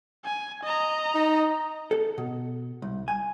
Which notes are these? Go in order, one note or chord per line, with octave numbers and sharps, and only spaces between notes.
G#5
D#5 A#5
D#4
A4
B2
C2
G#5